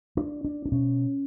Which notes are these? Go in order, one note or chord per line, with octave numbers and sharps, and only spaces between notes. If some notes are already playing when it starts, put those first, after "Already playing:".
D4
D4
D4
B2 C#4